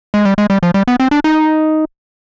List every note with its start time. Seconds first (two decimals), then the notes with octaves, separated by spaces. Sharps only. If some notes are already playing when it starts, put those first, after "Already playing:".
0.14 G#3
0.25 G3
0.38 G#3
0.50 G3
0.63 F3
0.74 G3
0.88 B3
1.00 C4
1.11 D4
1.24 D#4